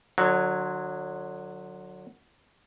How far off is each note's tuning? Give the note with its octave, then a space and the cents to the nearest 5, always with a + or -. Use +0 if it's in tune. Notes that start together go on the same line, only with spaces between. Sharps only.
D3 +30 F#3 -10